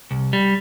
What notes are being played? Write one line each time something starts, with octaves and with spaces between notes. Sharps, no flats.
C2
G3